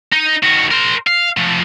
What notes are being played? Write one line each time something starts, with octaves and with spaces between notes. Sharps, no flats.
D#4
D#3 F#4
A#4 C5
F5
F3 A3